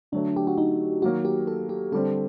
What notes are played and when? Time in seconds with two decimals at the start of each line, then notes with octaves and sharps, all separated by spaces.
0.12 D3 F#3 A3 D4
0.36 G4
0.47 F#4
0.58 D#4
1.02 D#3 F#3 A#3 F#4
1.25 G4
1.47 A4
1.69 G4
1.92 D3 G3 C4 A4